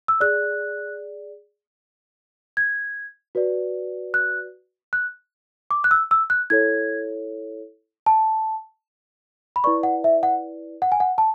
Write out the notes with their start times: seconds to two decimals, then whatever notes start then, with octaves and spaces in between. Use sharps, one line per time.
0.08 E6
0.20 G#4 D5 F#6
2.57 G#6
3.35 F#4 B4 D5
4.14 F#6
4.93 F#6
5.71 D6
5.84 F#6
5.91 E6
6.11 E6
6.30 F#6
6.50 E4 A4 C#5 G#6
8.06 A5
9.56 B5
9.64 E4 B4 D5 C#6
9.83 F#5
10.04 E5
10.23 F#5
10.82 F#5
10.92 G#5
11.00 F#5
11.18 A5